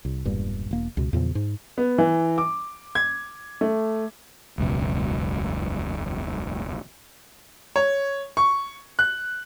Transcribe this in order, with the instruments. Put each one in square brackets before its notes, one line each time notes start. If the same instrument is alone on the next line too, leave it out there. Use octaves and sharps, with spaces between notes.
[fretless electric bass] C2
E1 G2 A#2
E1 A#3
C#2 B2
E2 A#2 C#3 F3
G#2
[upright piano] B3
E3
D6
G#6
A3
[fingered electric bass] E1 C#2 F#2 B2
[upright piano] C#5
C#6
F#6